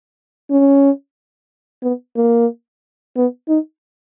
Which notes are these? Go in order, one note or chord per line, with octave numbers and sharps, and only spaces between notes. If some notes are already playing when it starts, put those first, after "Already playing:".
C#4
B3
A#3
B3
D#4